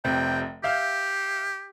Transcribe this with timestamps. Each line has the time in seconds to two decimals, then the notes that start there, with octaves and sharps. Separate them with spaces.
0.05 F1 C3 G5
0.64 G4 E5 F5 G6